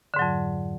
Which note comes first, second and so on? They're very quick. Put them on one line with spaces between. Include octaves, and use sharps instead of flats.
D3 G#2 F#3 F2